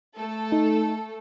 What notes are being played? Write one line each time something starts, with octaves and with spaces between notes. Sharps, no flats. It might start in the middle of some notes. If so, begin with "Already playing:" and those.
A3 A4
D#4